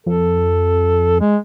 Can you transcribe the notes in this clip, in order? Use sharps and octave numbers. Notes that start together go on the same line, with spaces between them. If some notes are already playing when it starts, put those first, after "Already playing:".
F2 A4
G#3